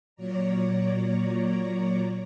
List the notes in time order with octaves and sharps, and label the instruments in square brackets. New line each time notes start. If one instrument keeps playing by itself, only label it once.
[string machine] A#2 F#3 C#5 D5 A#5